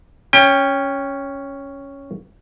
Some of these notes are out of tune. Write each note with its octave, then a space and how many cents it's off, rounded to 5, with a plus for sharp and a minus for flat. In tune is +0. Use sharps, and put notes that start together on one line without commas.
C#4 +0 G5 +25